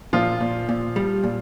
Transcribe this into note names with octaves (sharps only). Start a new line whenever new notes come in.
A#2 F3 F4
A#2
A#2
G3
A#2